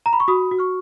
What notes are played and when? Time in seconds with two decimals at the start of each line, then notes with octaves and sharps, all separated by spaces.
0.06 A#5
0.13 B5
0.20 C#6
0.28 F#4 B5 D#6
0.51 F#4
0.58 C#6 F6